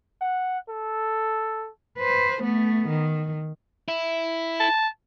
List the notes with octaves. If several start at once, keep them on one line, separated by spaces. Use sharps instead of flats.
F#5
A4
B4 C5
A3 B3
D#3
E4
A5